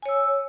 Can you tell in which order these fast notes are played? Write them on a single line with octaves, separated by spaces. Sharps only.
G#5 C#5 E6